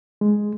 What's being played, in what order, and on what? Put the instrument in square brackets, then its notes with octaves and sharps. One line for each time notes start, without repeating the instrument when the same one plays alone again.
[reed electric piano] G#3